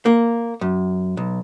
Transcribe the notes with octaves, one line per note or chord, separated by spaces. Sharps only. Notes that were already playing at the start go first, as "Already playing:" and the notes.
A#3
F#2
B1